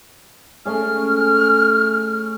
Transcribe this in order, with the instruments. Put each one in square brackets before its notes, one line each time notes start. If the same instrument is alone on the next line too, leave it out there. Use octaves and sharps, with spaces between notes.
[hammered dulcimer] A3 C#4 G#4 [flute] F6